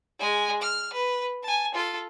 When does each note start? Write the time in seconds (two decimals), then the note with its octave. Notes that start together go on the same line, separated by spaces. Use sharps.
0.19 G#3 G#5
0.62 F6
0.93 B4
1.43 G#5 A5
1.74 F4 A4